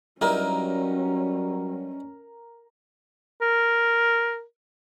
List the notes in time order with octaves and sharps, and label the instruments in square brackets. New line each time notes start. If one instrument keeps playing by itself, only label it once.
[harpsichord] G2 D#4 E4 [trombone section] F#3 G3 [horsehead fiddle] C#4 [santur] A#4
[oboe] A#4